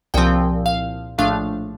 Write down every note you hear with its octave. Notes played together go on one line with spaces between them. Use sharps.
C2 A#2 F3 C4 G5
F5
A#1 A2 F3 A3 D4 F5